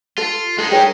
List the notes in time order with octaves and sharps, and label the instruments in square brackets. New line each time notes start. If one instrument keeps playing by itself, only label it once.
[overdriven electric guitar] F4 [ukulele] A4
[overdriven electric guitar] G#3 D#4 [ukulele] A4
[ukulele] G#4 A#4 C#5 [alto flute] G5